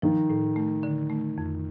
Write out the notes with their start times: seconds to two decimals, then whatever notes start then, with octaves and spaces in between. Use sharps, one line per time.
0.02 D#3 F3
0.30 A2
0.56 A3
0.83 D3
1.10 A3
1.38 F2